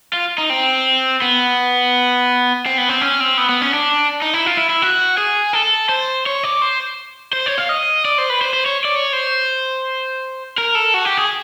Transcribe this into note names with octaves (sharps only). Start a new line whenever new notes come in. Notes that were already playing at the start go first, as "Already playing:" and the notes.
F4
D#4
C4
B3
C4
B3
C4
C#4
C4
B3
B3
C#4
D4
D#4
E4
F4
E4
E4
F#4
G#4
A4
C5
C#5
D5
C5
C5
C#5
F5
D#5
D5
C5
B4
C5
C5
C#5
D5
C#5
C5
A#4
A4
F#4
G4
G#4